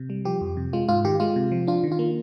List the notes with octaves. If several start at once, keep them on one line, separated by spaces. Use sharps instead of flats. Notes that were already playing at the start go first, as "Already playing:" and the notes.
Already playing: C3
G3
F3 G4
F2
C3
G#3 F4
G#2 F4
D#3 G4
G#3 F4
C3
F3
D4 F4
D#3
F4
A#3